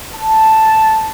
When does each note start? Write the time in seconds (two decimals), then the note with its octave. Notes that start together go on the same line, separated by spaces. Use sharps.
0.14 A5